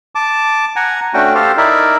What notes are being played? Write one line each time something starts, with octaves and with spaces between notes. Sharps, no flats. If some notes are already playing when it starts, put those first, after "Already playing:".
A5 D6
F#5 G#5 A#5
A3 C#4 D4 F#4 G5
G4 A4 C5 F5
D#4 E4 A#4 D5 E5